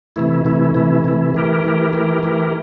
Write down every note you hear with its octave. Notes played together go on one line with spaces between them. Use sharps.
C3 E3 A3 E4
C3 E3 A3 E4
C3 E3 A3 E4
C3 E3 A3 E4
E3 A3 E4 G4 A#4
E3 A3 E4 G4 A#4
E3 A3 E4 G4 A#4
E3 A3 E4 G4 A#4